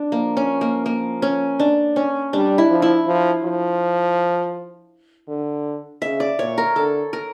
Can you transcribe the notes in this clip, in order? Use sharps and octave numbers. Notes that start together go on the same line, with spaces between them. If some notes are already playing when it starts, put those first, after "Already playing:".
Already playing: D4
F3 A#3
C#4
A#3
A#3
C#4
D4
C#4
G3 D4
E4
F3
E4
F3
F3
D3
C#3 E5
D5
A#2 C#5
A#4
D3 A4
A#4